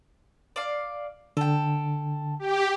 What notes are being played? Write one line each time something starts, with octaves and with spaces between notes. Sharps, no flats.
D5 F5
D3 A4 G5
G4